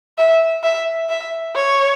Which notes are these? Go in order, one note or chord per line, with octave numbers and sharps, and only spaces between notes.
E5
E5
E5
C#5